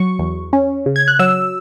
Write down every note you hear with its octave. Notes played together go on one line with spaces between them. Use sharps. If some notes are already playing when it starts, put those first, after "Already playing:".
Already playing: F#3 C#6
E2
C#4
C#3
G#6
F#6
F#3 E6